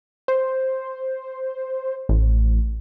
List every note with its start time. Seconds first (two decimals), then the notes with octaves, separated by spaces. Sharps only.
0.28 C5
2.09 A1